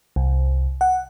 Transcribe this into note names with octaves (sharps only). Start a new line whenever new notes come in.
C2
F#5